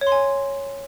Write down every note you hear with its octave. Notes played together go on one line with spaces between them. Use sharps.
C#5
C6
G#5